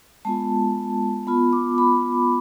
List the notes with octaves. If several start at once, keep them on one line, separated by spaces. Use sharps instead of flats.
G#3 B3 F4 A5
B3 F4 B5
D6
B5